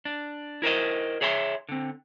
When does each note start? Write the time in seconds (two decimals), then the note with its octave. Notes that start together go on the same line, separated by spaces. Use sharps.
0.05 D4
0.62 E4 A#4 C5 D#5
1.21 G#4 C#5 E5 F5 C6
1.69 D3 C4